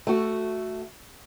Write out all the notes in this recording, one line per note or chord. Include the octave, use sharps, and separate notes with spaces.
A3 F#4